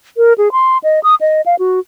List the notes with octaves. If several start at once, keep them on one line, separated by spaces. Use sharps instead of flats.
A#4
G#4
C6
D#5
D#6
D#5
F5
F#4